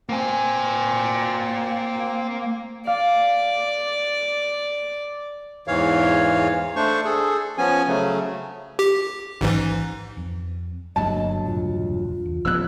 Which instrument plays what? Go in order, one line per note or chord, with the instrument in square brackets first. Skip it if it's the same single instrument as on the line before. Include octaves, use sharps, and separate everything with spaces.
[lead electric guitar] A#3 G#5 [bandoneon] C4
[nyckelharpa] D5 [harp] F5
[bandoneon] E2 G#2 E3 C#5 F5
A3 D4 C5 C#6
G#4 A4
F3 B3 C#4 G#5
C#3 F#3 A3
[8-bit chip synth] G4
A1 G#2 E3
[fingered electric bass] F2
[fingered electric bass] G1 A#3 [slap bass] D2 G2 F#3 [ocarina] D#5 [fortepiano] A5
[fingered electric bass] E1 C#2 A#2 [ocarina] F4
[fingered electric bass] E2
[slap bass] F1 F3 B3 [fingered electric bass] C#2 A#2 C#3 [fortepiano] E6 F#6